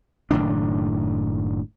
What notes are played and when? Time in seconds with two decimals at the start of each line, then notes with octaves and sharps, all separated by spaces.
0.31 F#1 A2 D#3 D4